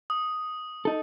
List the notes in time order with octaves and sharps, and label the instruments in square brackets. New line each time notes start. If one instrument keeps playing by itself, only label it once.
[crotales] D#6
[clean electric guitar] D#4 A4